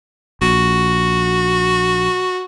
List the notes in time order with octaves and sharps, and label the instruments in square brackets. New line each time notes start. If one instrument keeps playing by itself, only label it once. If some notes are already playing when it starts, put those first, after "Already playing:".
[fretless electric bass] A#1 [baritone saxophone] F#4